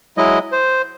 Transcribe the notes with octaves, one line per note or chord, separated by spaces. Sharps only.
F#3 G#3 E4 D#5
C5